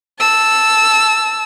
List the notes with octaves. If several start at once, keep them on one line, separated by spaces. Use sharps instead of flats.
A5 E6